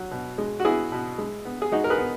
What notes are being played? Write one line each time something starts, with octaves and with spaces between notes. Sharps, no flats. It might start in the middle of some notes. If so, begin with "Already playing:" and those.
Already playing: F#3
B2
G#3
F#4
B3 E4 G#4
B2
G#3
B3
G#4
G#3 D#4 F#4
A#4
G#4 B4
B3